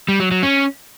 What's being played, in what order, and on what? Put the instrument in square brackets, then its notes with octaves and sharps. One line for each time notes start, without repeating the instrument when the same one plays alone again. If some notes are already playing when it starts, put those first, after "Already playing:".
[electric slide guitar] G3
F#3
F#3
C#4